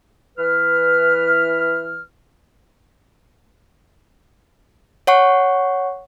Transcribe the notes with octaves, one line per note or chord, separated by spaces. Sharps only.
E3 B4 F6
C#5 F#5 C#6